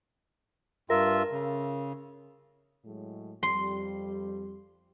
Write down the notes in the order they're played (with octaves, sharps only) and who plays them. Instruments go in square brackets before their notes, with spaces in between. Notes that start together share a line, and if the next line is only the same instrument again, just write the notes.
[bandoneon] G2 F4 E5 [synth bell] A#4
[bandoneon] C#3
[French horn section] A2 F#3 G#3
[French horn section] F2 G3 [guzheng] C6